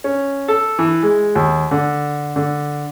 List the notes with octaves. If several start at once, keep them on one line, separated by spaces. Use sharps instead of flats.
C#4
A4
E3
G#3
D#2
D3
D3